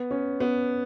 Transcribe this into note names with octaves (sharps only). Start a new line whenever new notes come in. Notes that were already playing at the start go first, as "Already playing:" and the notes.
Already playing: B3
C#4
B3